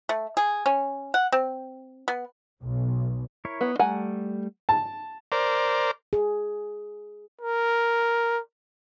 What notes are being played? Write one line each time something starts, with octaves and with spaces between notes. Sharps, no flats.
A3
G#4
C#4
F#5
C4
B3
B1
E4 A#4 C#5
B3
G3 A3 F#5 G#5 A#5
A5
A#4 C5 D5
G#4
A#4